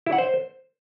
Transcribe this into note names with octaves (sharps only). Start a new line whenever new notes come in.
E4
F#5
C5